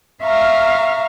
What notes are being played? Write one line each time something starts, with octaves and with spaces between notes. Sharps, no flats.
E5 F5 A#5 C#6 F6